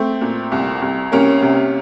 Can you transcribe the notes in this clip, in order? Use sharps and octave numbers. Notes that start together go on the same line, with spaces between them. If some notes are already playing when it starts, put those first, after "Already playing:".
Already playing: A3 C4
A#2
C2
C2
C2 A#3 C#4
C3